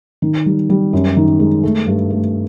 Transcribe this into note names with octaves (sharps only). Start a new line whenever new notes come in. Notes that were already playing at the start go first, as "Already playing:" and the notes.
D#3
G3
G3
F#2
D#3
G#3
A3
G2
A3